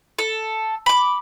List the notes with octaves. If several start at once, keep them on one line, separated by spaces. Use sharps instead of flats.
A4
B5 D6